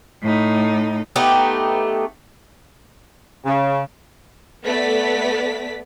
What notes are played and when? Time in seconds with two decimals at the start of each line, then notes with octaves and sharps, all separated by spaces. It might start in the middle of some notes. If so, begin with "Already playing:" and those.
0.22 A2 D#4
1.16 A3 B3 D#4 G4
3.45 C#3
4.65 A3 B3 D5 B6